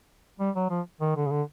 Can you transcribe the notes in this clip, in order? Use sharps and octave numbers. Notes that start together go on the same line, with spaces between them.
G3
F#3
F3
D#3
D3
C#3
D3